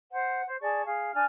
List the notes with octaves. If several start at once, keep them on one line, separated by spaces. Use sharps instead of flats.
C5 F#5
C5
G#4 D5 A5 C#6
G#4 F5
D4 G#5 F6